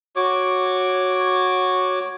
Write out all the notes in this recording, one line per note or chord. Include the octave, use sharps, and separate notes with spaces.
F#4 C#5 D6